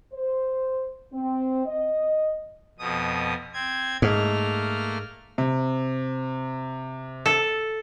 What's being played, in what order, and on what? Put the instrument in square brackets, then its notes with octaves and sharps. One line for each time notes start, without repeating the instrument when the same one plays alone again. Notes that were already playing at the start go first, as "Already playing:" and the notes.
[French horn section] C5
C4
D#5
[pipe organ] F2 B2 D#6
C4 G#6
[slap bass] G#2 [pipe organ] A3 A#3 F6
[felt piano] C3
[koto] A4